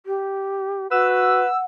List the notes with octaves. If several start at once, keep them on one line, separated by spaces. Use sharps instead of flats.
G4
F#4 B4 F#5 E6